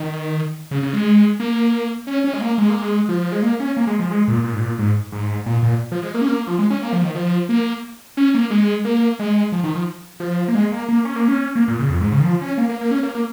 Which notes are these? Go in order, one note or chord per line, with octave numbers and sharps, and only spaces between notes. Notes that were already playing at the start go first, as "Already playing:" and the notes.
Already playing: D#3
C#3
C#3
G#3
A#3
C#4
C#4
G#3
A#3
G#3
A#3
G#3
F3
G#3
A#3
C#4
A#3
G#3
F3
G#3
A#2
A#2
G#2
A#2
G#2
G#2
A#2
A#2
F3
G#3
A#3
C#4
A#3
F3
G#3
C#4
A#3
F3
D#3
F3
A#3
C#4
A#3
G#3
A#3
G#3
F3
D#3
F3
F3
A#3
G#3
A#3
A#3
C#4
A#3
C#4
A#3
A#2
C#3
F2
G#2
C#3
D#3
F3
C#4
A#3
A#3
A#3
C#4
A#3
A#3